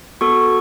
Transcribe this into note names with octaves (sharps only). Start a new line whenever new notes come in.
B3 F#4 A4 C#6